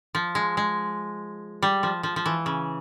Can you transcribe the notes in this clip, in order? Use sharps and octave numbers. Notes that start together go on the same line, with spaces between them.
F3
G#3
G#3
G3
F3
F3
F3
E3
C#3